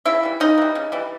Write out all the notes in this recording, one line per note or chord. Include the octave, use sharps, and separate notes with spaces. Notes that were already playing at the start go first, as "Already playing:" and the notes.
C#3 E4 E5
E3 G3
C#3 D#4 D#5
E3 G3
C#3
E3 G3